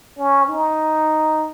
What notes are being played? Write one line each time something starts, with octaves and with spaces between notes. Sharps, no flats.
C#4
D#4